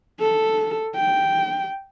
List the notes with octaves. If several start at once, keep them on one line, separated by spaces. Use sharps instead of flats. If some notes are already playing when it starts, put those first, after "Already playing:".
A4
G5